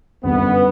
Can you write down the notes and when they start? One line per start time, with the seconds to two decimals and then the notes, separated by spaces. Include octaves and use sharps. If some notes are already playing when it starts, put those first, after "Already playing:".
0.23 G1 F#2 D3 G3 B3 C4